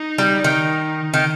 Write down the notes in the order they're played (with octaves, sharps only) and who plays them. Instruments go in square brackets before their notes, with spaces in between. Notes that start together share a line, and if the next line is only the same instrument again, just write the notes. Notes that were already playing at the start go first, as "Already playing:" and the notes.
Already playing: [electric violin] D#4
[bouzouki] G3
D#3
D#3